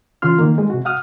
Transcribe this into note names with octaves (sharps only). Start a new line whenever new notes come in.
C#3 E3 F4 C6 F6
D#3 A#3
G#3
C3 F#4
F5 F#5 D#6 F6